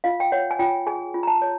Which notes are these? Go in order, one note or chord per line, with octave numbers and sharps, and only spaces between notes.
F4 F5
G5
C#5 F#5
G#5
F4 G5
G#4 G#5
F4
A#5
A5
C#5